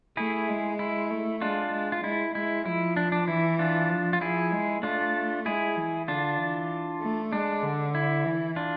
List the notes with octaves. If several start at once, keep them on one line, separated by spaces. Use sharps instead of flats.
A3 E4 G#4
G#3
E4
A3
G#3 D4 F4
G#3
F4
G#3 E4
G#3 E4
F3 E4
D4
D4
E3 E4
D4 F4
F3
F4
F3 E4 G#4
G#3
A3 D4 F4
G#3 E4 G#4
E3
D3 D4 F4
E3
A3
G#3 D4
D3
E4
E3
D4 F4